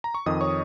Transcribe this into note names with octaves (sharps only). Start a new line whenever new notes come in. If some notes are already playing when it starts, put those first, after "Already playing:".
A#5
C#6
F2 D#3 D#5 D#6
C#5 C#6